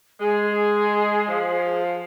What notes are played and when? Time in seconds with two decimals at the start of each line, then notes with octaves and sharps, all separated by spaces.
0.21 G#3 G#4
1.28 F3